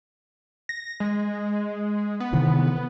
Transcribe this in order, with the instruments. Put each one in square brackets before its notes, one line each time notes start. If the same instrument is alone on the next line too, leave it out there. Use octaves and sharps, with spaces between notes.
[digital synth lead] A#6
G#3
B3
[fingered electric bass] C3 D#3 E3